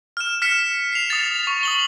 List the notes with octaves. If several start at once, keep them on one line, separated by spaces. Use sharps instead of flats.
F6 E7
F6 B6 C#7 E7
C7 F7
D#6 A6
C#6
D#6 F#7 G7